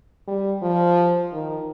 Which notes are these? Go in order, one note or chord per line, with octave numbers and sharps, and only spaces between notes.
G3
F3
D#3